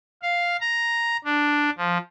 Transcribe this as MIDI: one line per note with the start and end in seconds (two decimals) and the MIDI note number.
0.23 0.57 77
0.61 1.17 82
1.24 1.70 62
1.78 1.98 53